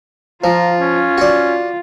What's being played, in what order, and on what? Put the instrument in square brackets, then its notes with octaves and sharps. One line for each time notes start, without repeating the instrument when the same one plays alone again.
[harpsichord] F3 [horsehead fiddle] F4 [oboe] A#5
[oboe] C#4
[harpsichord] F#4 D5